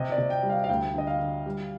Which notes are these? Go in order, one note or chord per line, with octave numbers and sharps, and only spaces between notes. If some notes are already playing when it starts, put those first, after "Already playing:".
Already playing: C3 D#5
D5
C3
G5
G3
F5
F5
D2 G5
D3 D#5
F5
D3
G3